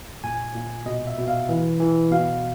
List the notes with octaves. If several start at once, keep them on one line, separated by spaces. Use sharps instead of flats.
A#2 G#5
A#2
B2 D#5
E5
B2
F5
E3
E3
B2 F5